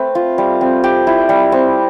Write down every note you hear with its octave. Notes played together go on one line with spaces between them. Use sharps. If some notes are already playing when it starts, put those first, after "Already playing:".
Already playing: A3 C4 B4
F4
G3
C4
G4
E4
G3
C4